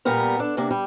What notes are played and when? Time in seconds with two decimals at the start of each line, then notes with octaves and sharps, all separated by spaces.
0.05 A#2 G3 B3 A#4 A#5
0.39 D4 A4
0.57 C3 A#3 D4
0.71 G3